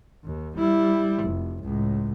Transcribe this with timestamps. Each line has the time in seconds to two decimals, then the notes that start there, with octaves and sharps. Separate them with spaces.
0.24 D#2
0.57 G3 E4
1.24 F1
1.63 C#2 A2